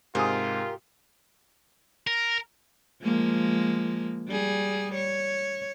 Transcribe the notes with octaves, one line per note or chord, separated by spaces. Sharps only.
G#2 C3 F4 G4 A#4 G#5 D#6
A#4
F3 G#3 A#3
G3 G#4
C#5